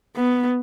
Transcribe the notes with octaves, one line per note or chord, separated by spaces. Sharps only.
B3